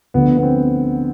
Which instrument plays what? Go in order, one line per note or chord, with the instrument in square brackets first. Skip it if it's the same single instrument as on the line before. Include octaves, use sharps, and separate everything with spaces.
[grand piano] D2 D3 F3 B3
B3
C4